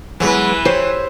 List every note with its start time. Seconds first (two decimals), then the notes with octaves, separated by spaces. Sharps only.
0.20 E3 F#3 G#3 B3 E4 B4
0.65 G4 C5 C#5